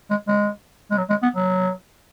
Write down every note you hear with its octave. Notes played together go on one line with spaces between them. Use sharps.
G#3
G#3
G#3
F#3
G#3
B3
F#3